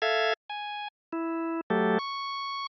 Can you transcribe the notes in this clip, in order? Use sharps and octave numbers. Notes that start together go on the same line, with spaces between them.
A4 E5 F5 G#6
G#5
E4
F#3 A3 G4 A4
C#6